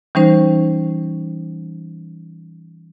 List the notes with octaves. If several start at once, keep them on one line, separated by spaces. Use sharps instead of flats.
E3 G3 C#4 D#4 C5